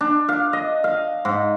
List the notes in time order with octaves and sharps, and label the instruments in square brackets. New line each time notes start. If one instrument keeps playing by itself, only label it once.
[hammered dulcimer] D4
F5
D#5
F5
G#2